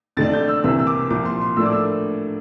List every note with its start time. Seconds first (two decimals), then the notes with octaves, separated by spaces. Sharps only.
0.17 F2 D3 A3 D4 A6
0.33 G6
0.48 E6
0.64 C2 C3 E3 A#3 E6
0.80 E6
0.87 D6
1.10 C2 A#2 F3 D6
1.25 C6
1.41 C6
1.57 A2 F3 A#3 D4 E6
1.66 D6
1.72 E6